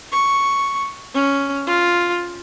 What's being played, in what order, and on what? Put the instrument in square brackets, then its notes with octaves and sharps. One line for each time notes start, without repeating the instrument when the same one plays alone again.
[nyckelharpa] C#6
C#4
F4